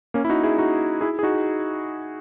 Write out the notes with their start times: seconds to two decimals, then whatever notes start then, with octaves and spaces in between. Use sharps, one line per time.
0.14 A#3 C#4
0.25 E4
0.29 D#4 F#4
0.43 E4 G#4
0.58 D#4 F#4
1.01 E4 G#4
1.19 G#4
1.23 D#4 F#4